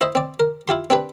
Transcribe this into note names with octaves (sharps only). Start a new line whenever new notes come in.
E4 C5 D#5 E5
C4 D5
A#4
E4 F4 G4 C6
C4 D4 G4 B4